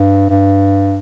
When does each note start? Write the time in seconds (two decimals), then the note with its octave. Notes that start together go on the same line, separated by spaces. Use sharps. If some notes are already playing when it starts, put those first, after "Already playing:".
Already playing: G2
0.30 G2